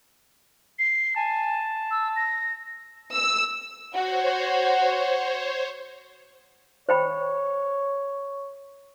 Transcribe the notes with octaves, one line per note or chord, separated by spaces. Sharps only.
C7
G#5 A5
E6
A#6
E6
F#4 C5 C#5
C5 C#5 G5 B5